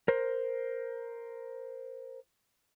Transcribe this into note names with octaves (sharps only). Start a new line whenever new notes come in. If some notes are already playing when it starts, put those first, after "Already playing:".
A#4 C5